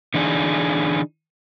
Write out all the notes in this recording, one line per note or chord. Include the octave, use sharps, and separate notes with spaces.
D3 E3 D4 D#4 G#4